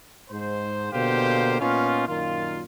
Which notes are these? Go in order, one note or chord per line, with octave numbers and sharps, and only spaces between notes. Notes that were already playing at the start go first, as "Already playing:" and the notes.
G#2 C5
B2 D3 A#3 G4 C5 F5
A#2 B3 C#4 D#4 F4
F#2 A#2 D#3 F4